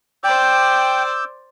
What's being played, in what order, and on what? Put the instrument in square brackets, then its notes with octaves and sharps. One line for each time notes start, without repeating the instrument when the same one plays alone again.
[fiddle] C5 D5 [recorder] G5 [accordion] D6 E6 G6